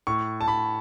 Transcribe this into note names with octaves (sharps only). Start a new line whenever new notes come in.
A2 C#6
A5
A2 B5